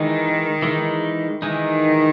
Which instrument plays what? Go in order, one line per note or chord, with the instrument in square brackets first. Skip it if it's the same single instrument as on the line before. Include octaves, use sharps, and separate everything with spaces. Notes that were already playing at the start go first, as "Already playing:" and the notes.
Already playing: [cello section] D#3 [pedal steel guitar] E3 G#3 D#4
[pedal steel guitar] E3 G#3 D#4
[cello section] D#3 [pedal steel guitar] E3 G#3 D#4